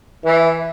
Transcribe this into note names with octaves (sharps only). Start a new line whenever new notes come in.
E3